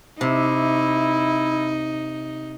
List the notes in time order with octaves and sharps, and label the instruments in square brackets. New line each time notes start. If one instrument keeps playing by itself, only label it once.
[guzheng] C3 [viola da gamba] D#4 [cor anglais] E4